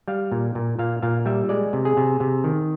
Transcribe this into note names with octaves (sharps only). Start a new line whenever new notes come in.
G3 F5
A#2
A#2
A#2 F5
A#2 F5
G3 E5
G#3 D5
C3
G#4
C3
C3
D#3